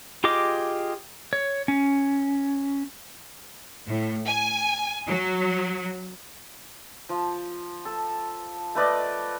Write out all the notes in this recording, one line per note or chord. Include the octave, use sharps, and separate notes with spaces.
F4 G4 G#4 D#5 D6
C#5
C#4
A2
G#5
F#3
F3
A4
A3 B4 D5 D#5